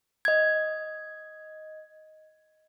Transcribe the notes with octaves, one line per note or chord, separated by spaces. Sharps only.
D#5 G#6